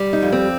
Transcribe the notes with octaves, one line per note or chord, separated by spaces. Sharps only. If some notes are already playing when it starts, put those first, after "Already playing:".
Already playing: G3
D#4
F2
C4